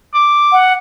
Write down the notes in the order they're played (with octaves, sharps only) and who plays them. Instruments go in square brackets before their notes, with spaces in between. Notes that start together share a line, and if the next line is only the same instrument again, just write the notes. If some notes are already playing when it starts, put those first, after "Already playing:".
[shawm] D6
[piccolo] F#5